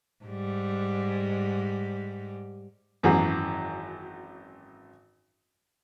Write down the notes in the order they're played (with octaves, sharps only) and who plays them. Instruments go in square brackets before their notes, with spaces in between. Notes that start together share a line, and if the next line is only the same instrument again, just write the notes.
[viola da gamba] G#2 G3
[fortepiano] G#1 F#2 E3 F#4 G#4